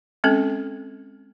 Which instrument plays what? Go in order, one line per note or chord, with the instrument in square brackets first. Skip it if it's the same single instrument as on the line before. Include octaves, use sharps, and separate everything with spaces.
[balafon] G#3 C4 C#4 A4